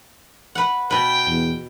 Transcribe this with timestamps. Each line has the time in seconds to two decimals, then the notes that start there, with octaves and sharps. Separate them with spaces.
0.55 B4 F#5
0.91 B2 B4 G5
1.29 E2